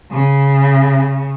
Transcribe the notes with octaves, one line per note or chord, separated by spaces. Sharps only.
C#3